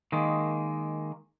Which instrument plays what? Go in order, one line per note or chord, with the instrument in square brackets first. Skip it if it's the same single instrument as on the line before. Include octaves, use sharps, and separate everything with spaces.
[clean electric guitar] D#3 G#3 A#3